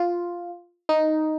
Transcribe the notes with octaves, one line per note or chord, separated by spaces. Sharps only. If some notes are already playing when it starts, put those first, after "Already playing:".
Already playing: F4
D#4